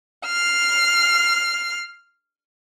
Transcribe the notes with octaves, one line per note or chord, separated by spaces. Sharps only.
F6 C7